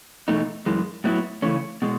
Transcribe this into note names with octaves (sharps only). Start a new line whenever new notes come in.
E2 B2 A3 D#4
F#2 E3 G#3
A2 F#3 B3 E4
E2 C#3 E3 A3 C#4
B2 G#3